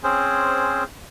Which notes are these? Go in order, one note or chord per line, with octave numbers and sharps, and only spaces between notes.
C4 C#4 G#4 C5